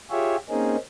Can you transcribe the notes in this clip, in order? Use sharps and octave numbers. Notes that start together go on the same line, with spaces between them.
F4 G4 G#4 C#5 E5
A#3 C4 C#4 D#4 G#4